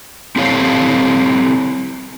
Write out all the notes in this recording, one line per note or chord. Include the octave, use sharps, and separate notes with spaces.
C4 E4 G4 A4 C#5 F5